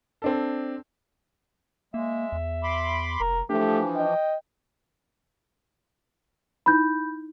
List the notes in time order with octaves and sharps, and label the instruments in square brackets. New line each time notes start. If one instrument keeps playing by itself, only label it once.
[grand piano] C4 D4 A4
[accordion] G#3 [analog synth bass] A#3 [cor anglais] E5
[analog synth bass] E2
[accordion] B5 C6 D6
[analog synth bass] F1 [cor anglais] A#4
[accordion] E3 F3 [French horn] A3 [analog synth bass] D4 [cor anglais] G4
[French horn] D#5 [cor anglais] G5
[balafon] D#4 E4 [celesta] B5 G6